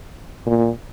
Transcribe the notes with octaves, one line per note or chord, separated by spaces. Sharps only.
A#2